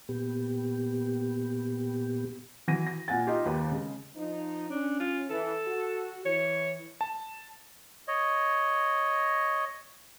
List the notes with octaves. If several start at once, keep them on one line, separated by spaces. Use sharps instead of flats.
A#2 B3 G4
E3 F#4 A#6 D#7
A#6
A#2 F#5 G#5 A6
D#4 F4 G4
D#2 G4 B4
C#3 G#3
F3 D#4
C#4 D4
F4
E3 A4
F#4
E3 C#5
A5
C#5 D#5